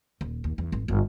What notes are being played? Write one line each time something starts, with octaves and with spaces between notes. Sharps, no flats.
D#1
D#2
E2
G#1
G1